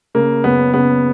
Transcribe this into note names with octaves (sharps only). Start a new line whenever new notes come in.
C#3 A#3
F#1 B3
C#3 B3